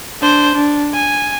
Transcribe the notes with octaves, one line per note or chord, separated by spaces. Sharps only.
D4 C5
D4
G#5